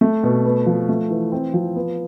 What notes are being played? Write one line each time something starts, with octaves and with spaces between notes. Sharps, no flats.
A3
B2
B3
F3
A3
E3
C4
F3
B3